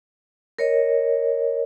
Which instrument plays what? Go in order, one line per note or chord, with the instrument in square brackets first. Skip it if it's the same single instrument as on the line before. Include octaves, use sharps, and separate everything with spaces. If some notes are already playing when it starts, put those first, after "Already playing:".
[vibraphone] A#4 C#5 D#5